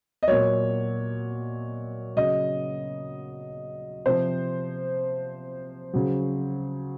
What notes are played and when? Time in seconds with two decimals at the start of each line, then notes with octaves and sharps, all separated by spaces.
0.23 D#5
0.28 A#2 F#3 C#5
2.16 C#3 F#3 D#5
4.06 C3 F3 C5
5.94 C#3 F#3